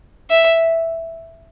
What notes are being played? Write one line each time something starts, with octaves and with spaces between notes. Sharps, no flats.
E5